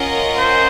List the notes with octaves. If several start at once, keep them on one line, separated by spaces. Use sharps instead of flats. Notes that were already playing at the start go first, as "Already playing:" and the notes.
Already playing: C#4 F4 A#4 D#5 F#5
C5